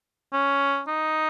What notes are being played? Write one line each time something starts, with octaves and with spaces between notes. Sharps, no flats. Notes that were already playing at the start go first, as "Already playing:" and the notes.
C#4
D#4